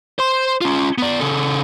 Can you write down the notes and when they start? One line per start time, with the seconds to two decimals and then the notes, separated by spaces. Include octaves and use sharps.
0.19 C5 C6
0.61 C#4 F4
0.98 B3 D5
1.20 C#3 A4